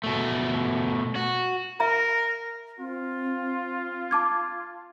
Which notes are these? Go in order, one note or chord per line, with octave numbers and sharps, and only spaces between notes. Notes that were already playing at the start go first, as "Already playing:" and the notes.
B2 A3
F#4
A#4 E5 A#5
C4 F4
A5 D6 G#6